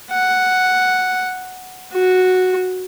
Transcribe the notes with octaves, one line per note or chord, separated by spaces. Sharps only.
F#5
F#4